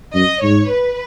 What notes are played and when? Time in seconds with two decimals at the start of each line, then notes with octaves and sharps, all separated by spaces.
0.14 F#2 D#5
0.43 G#2 C#5
0.71 B4